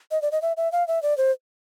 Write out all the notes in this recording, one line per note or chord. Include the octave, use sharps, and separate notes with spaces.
D#5
D5
D#5
E5
E5
F5
E5
D5
C5